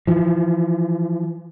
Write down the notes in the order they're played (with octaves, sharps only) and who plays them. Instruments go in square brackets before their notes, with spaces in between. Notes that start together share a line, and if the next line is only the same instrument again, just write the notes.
[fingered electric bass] E3 F3